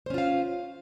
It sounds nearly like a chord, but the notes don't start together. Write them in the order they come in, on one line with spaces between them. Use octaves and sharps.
C5 C#4 F4 F5